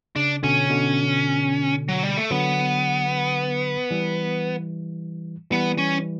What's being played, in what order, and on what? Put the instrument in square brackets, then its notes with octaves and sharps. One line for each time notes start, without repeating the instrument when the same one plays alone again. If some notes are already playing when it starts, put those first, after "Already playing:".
[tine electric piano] C#3 [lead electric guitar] D4
[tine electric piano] B2 D3 [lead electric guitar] C#4
[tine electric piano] B2 D3
[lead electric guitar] F#3
G3
A3
[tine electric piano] D3 F#3 [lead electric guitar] B3
[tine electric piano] E3 G3
[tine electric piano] E3 G3 [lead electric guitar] B3
[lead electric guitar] C#4